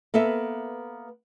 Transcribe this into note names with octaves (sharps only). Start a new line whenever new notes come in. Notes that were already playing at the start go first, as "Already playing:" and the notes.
A#3 B3 A4 B4 E5